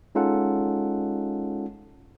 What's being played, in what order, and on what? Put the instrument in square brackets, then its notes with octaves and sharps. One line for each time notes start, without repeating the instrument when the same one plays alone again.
[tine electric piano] G#3 C#4 D#4 F4 A4 F#5